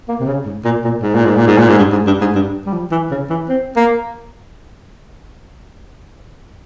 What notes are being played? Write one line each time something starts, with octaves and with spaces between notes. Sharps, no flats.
A#3
C3
C#3
G#2
A#2
A#2
G#2
A#2
G#2
A#2
G#2
A#2
G#2
G2
G#2
G2
G#2
G2
G3
F3
E3
C#3
E3
C4
A#3